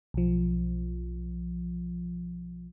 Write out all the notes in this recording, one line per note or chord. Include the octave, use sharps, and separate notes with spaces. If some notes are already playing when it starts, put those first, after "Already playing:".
B1 F3